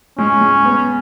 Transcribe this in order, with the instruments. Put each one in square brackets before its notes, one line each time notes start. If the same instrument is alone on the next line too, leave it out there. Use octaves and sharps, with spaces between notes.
[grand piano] G#3 [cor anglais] C#4
[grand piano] G#3
B3